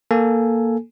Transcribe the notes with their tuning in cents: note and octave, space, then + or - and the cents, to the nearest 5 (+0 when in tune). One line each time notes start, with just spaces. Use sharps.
A#3 +0 A4 +0 G#5 +0